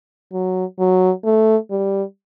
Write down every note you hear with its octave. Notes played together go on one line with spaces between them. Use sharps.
F#3
F#3
A3
G3